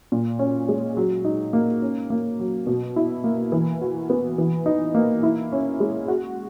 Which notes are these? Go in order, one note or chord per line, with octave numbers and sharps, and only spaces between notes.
A#2
C#4
G#3
F#3
D#4
A#3
C#4
A#3
F#3
B2
E4
A#3
E3
F#4
B3
E3
D#4
A#3
E4
C#4
G#3
F#4